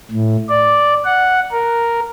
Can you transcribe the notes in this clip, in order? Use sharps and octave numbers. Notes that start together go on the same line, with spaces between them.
A2
D5
F#5
A#4